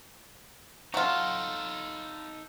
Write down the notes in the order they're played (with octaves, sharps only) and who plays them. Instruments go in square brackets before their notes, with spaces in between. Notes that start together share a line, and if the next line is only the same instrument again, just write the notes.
[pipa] F#3 F4 [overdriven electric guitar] D#4 A4